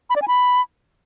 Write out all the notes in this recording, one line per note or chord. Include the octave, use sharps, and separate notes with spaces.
B5
D5
G#5
B5